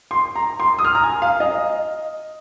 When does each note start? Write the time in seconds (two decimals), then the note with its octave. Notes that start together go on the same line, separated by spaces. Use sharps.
0.11 C6
0.35 A#5
0.60 C6
0.79 D#6
0.84 F6
0.95 A#5
1.04 G#5
1.22 F5
1.40 D#5